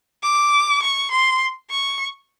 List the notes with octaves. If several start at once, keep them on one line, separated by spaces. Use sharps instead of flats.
D6
C#6
C6
C#6